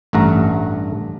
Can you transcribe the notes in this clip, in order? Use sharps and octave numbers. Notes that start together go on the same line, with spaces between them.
A1 G2 A3 F#5 A#5